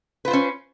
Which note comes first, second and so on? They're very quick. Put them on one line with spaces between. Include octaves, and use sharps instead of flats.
B4 F4 C5 C#4